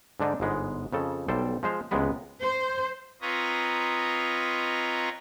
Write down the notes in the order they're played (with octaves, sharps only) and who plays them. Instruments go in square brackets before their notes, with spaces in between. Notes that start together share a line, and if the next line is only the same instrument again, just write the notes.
[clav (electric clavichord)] G#2 D3 D4 D#4
G1 G#2 G#3 B3
F2 C#3 A4
B1 G3 A4 C5 G5
F3 G#3 C5 F5
C#2 C3 E3 G#3 B3 B4
[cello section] C5
[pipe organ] C4 F4 B4 C#5 D#5 A#5